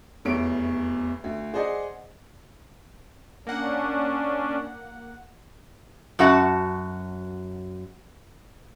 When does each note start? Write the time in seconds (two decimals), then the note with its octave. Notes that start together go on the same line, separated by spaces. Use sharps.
0.25 F1 E2 C#5 D7
1.24 D2
1.54 G#4 C5 D5 D#5 F#5 G#5
3.47 A#3 C#4 D4 F#5
6.19 F#2 F#4 F#5 A5